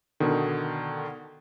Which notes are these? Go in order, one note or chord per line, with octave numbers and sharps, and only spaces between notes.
B2 D3 D#3